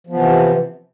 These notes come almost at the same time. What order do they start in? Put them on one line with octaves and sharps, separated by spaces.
F3 B3 E3 C3